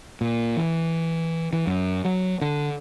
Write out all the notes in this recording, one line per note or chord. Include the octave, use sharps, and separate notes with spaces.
A#2
E3
E3
F#2
F#3
D3